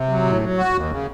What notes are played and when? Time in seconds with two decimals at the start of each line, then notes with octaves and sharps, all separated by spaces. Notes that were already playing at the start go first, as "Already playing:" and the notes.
Already playing: C3
0.09 F#3
0.25 A2
0.42 F#3
0.57 F#4
0.74 D#2
0.90 C#3